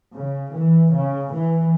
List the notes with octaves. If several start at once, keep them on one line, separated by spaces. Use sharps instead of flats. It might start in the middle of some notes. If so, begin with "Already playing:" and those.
C#3
E3
C#3
E3